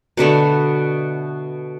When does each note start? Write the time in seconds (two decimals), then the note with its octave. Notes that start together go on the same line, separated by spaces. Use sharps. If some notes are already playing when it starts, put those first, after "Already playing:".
0.17 B2 D3 A3 B3